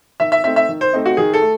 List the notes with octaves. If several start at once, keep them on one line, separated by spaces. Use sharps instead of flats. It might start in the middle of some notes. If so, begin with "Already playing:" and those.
D#3 E5
E5
A3 C4 D#4 E5
E5
D#3
C5
A3 C4 D#4
F#4
D#3 G#4
A4
A3